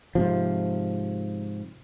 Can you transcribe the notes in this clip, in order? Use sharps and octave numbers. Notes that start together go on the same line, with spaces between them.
G#2 C3 F3